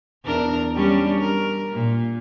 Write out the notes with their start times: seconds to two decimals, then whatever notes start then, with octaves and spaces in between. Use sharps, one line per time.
0.24 E2 D4 A#4
0.75 G3 C#4 D4
1.21 A#4
1.72 A#2